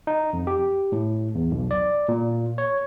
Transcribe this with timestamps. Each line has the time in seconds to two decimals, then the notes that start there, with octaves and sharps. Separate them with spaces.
0.07 D#4
0.33 F2
0.47 G4
0.92 A2
1.35 E2
1.51 B1
1.71 D5
2.09 A#2
2.58 C#5